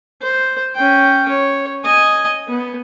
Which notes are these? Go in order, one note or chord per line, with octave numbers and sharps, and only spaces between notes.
C5
C#4 G5
C#5
D#5 G#5
B3